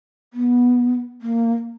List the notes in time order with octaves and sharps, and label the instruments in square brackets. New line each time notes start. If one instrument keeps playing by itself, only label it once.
[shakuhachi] B3
A#3